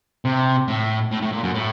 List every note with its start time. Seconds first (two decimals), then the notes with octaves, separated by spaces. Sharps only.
0.25 C3
0.68 A2
1.11 A2
1.22 A2
1.32 A#2
1.43 F#2
1.54 A2